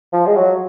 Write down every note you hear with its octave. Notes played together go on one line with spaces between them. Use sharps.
F3
G#3
F#3